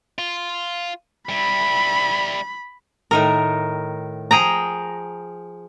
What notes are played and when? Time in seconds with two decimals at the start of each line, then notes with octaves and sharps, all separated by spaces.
0.18 F4
1.29 G3 E4 B5
3.11 A2 D#3 A#4
4.31 F3 G#4 G5 A#5